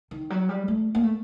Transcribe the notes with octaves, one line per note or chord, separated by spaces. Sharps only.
D#3
F#3
G3
A3
A#3
A3